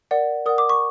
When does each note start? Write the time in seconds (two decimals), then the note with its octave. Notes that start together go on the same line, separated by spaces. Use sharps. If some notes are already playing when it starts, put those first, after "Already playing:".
0.11 A#4 D5 F#5
0.46 A#4 D5 F#5 D#6
0.58 D6
0.69 C#6